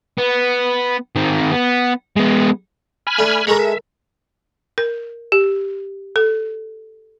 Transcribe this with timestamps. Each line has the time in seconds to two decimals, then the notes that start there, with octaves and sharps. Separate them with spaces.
0.18 B3
1.15 D#3 C4
1.52 B3
2.16 G#3 B3
3.07 G#5 B5 F6
3.18 A3 D4
3.47 G#3 A4 A#4 A#5 B5 C#6
3.59 E5
4.78 A#4
5.32 G4
6.16 A4